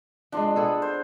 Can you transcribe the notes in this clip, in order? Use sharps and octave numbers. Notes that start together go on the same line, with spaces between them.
F3 G#3 D4 C6
B3 G#4 A4
C5